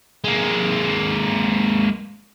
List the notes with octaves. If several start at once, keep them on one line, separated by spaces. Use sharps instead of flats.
G#3 A#3